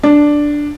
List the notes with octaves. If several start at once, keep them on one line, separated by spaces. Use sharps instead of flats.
D4